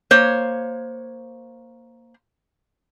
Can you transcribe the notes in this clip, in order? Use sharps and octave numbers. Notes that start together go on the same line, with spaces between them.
A#3 C5 C#5